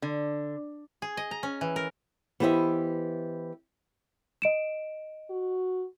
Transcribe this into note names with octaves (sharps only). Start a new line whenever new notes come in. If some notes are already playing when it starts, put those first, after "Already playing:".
D3
G#4
D#5
A#5
C#4
E3
A#4
E3 B3 G4 C5 D#5 E5
D#5 D7 E7
F#4